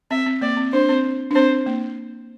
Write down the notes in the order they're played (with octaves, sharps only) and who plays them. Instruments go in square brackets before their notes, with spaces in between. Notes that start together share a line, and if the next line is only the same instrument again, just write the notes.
[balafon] C4 [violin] E5
[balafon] C4
[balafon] A#3 [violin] D5
[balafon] C4
[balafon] D4 [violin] C5
[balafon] C4
D4
[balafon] C4 [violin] C5
[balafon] A#3